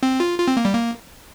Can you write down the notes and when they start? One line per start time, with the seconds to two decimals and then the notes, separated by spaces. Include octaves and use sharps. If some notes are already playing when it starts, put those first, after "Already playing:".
0.03 C4
0.20 F4
0.38 F4
0.47 C4
0.57 A#3
0.65 G3
0.74 A#3